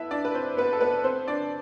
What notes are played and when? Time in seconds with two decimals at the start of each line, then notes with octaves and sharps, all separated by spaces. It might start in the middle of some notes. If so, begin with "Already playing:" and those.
Already playing: B3 E4 A4 B4 E5
0.11 D4 D5
0.25 B4
0.35 C4 C5
0.57 B3 B4
0.73 A4
0.81 B3 B4
1.04 C4 C5
1.28 D4 D5